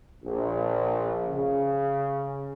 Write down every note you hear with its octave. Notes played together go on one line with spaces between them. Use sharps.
A#1
C#3